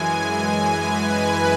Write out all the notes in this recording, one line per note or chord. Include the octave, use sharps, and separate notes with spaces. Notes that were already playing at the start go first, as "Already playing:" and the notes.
Already playing: F#2 E3 G#3 G#5
B4